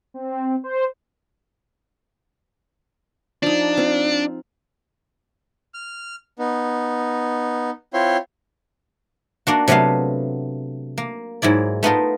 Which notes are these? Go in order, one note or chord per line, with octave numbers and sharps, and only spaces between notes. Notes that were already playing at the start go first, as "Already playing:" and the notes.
C4
C5
F3 D4 D#4
C4 F4
F6
B3 D#4
C4 E4 F4 C#5 C6
A#3 D4 F#4
C3 F#3 A3 B3 F5
A#3
G#2 F#3 E4 D5
A3 B3 D#4 F4 A#4